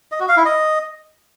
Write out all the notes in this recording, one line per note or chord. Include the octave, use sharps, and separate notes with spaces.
D#5
F#4
F5
E4
D#5